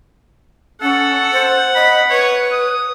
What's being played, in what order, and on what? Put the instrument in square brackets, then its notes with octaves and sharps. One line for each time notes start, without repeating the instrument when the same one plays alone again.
[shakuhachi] C#4 [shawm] A4 [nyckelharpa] F#5
[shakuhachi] C5
[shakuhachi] D#5 [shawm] B5
[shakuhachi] B4 [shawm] C#5
[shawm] D#6